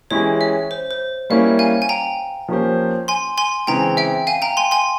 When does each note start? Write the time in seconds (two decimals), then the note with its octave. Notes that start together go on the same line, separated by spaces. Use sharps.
0.11 E3 G#3 C#4 E4 G4 C#5
0.41 E5
0.71 C5
0.91 C5
1.30 G3 A#3 C#4 E4 F5
1.59 F5 G#5
1.82 G#5
1.89 G5 A#5
2.49 F3 A#3 C#4 G4 C5
3.08 G#5 C6
3.38 G#5 C6
3.67 C#3 E3 G#3 C4 G5 A#5
3.97 E5 G5
4.27 F5 G#5
4.42 G5 A#5
4.57 G#5 C6
4.71 G#5 C6